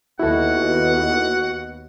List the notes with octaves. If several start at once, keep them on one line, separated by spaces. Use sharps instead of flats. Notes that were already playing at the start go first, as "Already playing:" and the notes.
D#2 B3 E4 F#4 A4 F#5